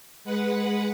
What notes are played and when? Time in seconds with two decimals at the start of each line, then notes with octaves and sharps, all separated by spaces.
0.24 G#3 B4 F#5